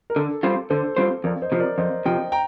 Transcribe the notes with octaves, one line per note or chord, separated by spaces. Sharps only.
A#4
D3 A4
G3 C4 F4 C5
D3 A4 C5
G3 C4 F4 C5
F2 A#4 D5
C5 D#5
C3 F3
A#4 D5
F2 C5 D#5
C3 F3 D#5 G5
G5 A#5